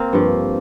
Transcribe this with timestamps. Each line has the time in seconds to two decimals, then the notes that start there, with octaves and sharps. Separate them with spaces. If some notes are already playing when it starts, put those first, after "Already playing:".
Already playing: A#3 C4
0.13 G2 F3